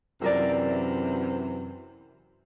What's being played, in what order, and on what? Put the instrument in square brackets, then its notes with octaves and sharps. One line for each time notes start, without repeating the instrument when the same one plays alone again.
[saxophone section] F#2 C3 E3 [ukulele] A4 A#4 D5